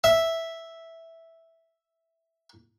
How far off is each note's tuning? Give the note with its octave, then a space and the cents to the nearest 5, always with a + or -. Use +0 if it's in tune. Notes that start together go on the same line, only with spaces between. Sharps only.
E5 -5